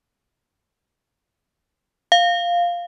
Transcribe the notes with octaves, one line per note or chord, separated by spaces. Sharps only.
F5